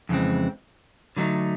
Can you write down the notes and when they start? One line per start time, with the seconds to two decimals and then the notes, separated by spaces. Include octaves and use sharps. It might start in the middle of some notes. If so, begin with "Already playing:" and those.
0.09 F2 C#3 E3 G#3 C4
1.17 D3 F#3 A3 C4 D#4